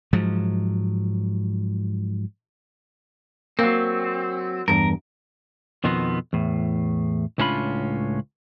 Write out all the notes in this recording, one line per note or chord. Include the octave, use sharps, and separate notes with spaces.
G#2 F3 F#3
F#3 A#3 C4
E2 G2 A#4
F2 B2 D#3 F3 B3 C4
E2 A2
C#2 A2 C#4 D4 F4 B5